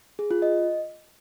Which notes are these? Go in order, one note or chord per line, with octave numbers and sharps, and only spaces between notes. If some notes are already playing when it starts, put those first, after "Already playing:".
G#4
F4
D#5